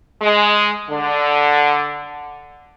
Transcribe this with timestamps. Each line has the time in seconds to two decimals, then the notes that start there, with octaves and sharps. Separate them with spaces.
0.21 G#3
0.90 D3